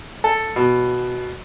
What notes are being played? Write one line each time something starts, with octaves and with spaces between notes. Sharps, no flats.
A4
B2